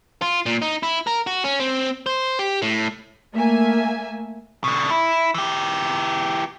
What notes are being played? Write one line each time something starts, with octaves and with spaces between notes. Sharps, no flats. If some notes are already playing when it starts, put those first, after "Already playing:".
F4
A#2
D#4
E4
A#4
F#4
C#4
C4
C5
G4
A2
A3 A#3 E5 G#5
B2 D3
E4
E3 G4